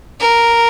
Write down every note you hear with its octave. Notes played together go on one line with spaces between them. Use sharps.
A#4